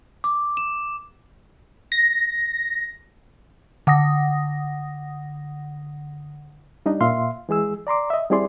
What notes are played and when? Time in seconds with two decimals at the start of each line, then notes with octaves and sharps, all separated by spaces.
0.24 D6
0.57 E7
1.92 A#6
3.87 D3 F#5 D#6 A#6
6.86 G3 D4 D#4 D#5
7.01 A#2 E5 F5 C6
7.49 E3 G#3 G#4 E6
7.87 D5 A#5 C6 D6
8.10 D#5 E5
8.30 G3 C4 E4 G#4 D5 C6